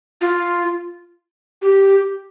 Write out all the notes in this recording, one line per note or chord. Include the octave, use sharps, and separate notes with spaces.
F4
G4